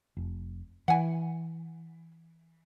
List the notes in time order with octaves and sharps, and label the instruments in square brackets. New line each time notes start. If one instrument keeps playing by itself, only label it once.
[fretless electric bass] F1
[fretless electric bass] E3 [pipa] F#5 G#5